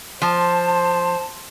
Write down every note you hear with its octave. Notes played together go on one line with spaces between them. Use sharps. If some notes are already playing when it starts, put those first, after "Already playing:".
F3 C5 A5